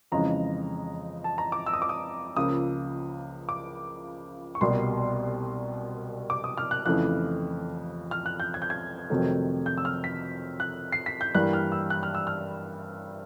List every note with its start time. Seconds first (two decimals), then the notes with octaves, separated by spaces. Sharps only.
0.12 F2 C#3 E3 G#3 A#5
1.24 A5
1.38 A#5
1.52 D6
1.66 E6
1.73 D#6
1.82 D6
1.89 D#6
2.36 C#2 C#3 F3 A#3 D#6
3.49 D6
4.55 C#6
4.61 C2 B2 G3 A#3 C6
6.30 D6
6.44 D#6
6.58 F6
6.71 F#6
6.86 F2 C#3 E3 A3 F#6
8.11 F6
8.26 F#6
8.40 G6
8.54 G#6
8.62 G6
8.70 G#6
9.10 F2 C3 D#3 F#3 A3
9.66 G6
9.78 E6
9.85 F6
10.04 B6
10.60 F#6
10.92 C7
11.06 B6
11.21 G6
11.35 G2 E3 G3 A#3 F#6
11.53 F6
11.72 E6
11.90 F#6
12.03 F6
12.15 E6
12.27 F6